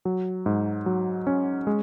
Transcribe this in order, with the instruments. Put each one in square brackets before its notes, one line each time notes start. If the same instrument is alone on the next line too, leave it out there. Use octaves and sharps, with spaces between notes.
[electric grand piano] F#3
G#2
F#3
C#4
G#3